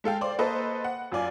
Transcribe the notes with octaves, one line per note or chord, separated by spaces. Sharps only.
G#3 A4 F5 G5
C5 D5 C6 D6
A#3 A4 B4 C5 D#5
F#5
F#2 F4 D5 G#5